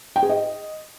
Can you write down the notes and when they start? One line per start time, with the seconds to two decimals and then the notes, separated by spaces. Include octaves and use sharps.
0.16 G5
0.23 G#4
0.29 D#5